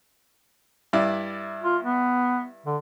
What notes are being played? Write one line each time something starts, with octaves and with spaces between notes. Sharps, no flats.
G2 E4 D5
F4
B3
D3